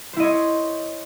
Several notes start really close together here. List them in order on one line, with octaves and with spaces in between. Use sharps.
C5 E4 D#5 C#5